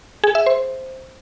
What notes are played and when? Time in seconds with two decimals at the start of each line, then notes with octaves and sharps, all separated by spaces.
0.24 G#4
0.35 E5
0.46 C5